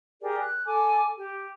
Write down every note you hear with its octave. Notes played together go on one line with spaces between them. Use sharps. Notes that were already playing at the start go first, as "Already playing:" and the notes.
G4 G#4 A#4 D5
F#6
A4 G#5 D6
G4